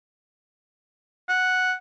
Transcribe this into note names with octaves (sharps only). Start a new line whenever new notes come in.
F#5